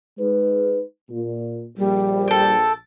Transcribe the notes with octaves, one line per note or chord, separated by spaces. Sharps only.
G#3 D#4 B4
A#2
A#1 G3
A4 G5